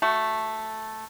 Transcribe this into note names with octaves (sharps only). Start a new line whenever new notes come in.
A3 F#4